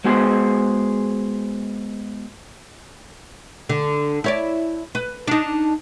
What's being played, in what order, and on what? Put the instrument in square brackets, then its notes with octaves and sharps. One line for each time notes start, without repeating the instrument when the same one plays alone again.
[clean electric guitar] G#3 B3 F#4 G#4 C5
[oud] D3
E4 C#5 D5
B4
D4 D#4